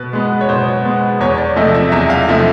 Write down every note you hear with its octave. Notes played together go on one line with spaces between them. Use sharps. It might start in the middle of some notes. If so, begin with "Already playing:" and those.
Already playing: B2 B4
G#3 B3
C#5
B2 C5
G#3 B3
E2 C#5
D5
C3 F3 A3 D#5
E5
E2 E5
F5
C3 F3 A3 E5